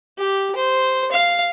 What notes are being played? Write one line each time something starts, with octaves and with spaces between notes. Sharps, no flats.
G4
C5
F5